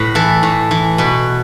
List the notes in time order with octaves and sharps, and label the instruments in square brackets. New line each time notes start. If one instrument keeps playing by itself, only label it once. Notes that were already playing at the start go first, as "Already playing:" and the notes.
Already playing: [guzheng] A2 B4
E3 A4
A2
E3
B2 B4